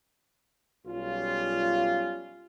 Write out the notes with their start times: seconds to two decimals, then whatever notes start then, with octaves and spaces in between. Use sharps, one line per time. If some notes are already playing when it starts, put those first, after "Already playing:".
0.86 B1 G3 C#4 F4